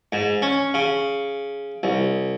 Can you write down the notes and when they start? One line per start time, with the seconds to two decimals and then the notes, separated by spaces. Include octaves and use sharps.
0.12 G#2
0.42 C#4
0.74 C#3
1.83 C2